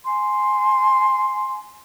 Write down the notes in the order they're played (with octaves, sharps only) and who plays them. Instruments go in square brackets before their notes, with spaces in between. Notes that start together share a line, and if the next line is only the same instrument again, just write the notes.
[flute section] G#5 C6